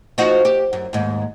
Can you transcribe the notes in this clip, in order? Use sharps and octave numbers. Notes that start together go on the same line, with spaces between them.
F3 D#4 F#4
G4
F#2
D#2 G#2